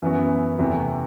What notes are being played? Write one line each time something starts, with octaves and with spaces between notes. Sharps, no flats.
F#2 E3 B3 F#4
E2 C3 E3 A3